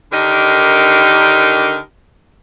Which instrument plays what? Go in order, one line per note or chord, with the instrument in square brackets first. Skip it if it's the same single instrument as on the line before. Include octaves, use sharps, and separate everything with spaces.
[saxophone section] D3 D#3 D4 D#4 G4 A#4